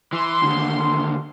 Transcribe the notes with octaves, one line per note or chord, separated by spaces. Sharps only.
E3 C6
D#2 D3